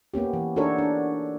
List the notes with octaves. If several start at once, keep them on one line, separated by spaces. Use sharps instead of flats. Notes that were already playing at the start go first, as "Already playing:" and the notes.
A#3 B3 C#4 G4
E3
D4 D#4 F#4 A4 A#4 C#5
D4